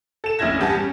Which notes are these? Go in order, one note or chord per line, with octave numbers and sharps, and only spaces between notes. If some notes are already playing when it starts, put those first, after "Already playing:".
A4 E7
F1 A#1 C#4 E4 G#6 A#6
E2 G2 G4 F#5 G#5 A5
G3 C#4